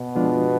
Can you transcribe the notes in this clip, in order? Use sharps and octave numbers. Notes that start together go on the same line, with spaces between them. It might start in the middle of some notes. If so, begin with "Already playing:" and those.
Already playing: B2
F3 G#3 B3 D4 F4